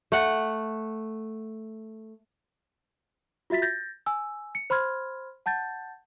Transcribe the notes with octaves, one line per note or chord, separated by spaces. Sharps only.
A3 F#5
F4 F#4 E5 A6 B6
G6 A6 A#6
G#5 E6
C#7
C5 B5 C6 F6 G#6
F#5 A5 G6 A6